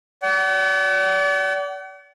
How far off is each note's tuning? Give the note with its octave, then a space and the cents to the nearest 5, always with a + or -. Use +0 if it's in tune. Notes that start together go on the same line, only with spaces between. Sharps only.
D5 -35 F#5 +40